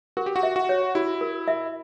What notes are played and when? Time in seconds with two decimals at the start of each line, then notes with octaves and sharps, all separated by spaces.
0.17 F#4 A#4
0.26 G4
0.36 F#4
0.43 E5
0.56 F#4
0.69 C#5
0.95 E4 F#4
1.21 A#4
1.48 E5